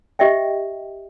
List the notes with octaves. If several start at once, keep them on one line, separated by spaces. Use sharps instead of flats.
G4 D#5 E5 G5